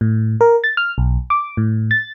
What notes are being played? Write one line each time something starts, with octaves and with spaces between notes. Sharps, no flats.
A2
A#4
A6
F6
B1
D6
A2
A6